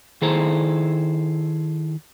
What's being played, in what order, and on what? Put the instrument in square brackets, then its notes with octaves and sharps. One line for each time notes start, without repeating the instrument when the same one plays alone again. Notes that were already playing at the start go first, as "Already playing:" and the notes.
[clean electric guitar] D#3 E4 G#4 A4 C5 A#5